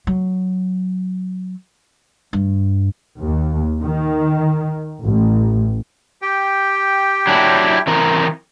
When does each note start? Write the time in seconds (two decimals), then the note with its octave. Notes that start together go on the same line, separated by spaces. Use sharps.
0.07 F#3
2.33 G2
3.20 D#2
3.82 D#3
5.05 A1
6.22 G4 G5
7.27 F#3 D4 E4
7.87 E3 C4 A#4